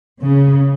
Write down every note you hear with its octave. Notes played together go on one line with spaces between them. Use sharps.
C#3